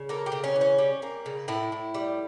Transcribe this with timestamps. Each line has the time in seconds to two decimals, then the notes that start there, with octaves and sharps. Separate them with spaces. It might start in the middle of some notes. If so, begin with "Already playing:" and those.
Already playing: C#3
0.09 A#3 A4
0.26 G4
0.32 C#3
0.44 C#4
0.56 E3
0.61 C#4
0.78 G3
1.02 A#3
1.26 C#3
1.48 A2 E4
1.72 A2
1.94 G3